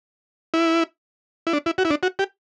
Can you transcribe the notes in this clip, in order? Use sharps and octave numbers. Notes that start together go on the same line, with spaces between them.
E4
E4
D4
E4
F#4
E4
D4
F#4
G4